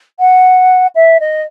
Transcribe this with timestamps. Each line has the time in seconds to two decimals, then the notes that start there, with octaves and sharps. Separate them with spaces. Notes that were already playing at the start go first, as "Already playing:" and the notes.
0.19 F#5
0.95 E5
1.20 D#5